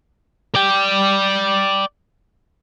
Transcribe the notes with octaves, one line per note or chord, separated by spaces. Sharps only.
D5 G5